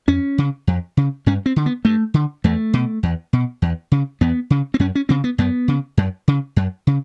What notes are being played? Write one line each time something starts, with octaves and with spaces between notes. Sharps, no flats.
F2 C#4
C#3
F2
C#3
G2 C#4
C4
D3
B3
G2 A3
D3
E2 A3
B2
E2
B2
E2
C#3
E2 B3
C#3
C4
F#2 C#4
C#4
C#3 C4
B3
F#2 B3
C#3
F#2
C#3
F#2
C#3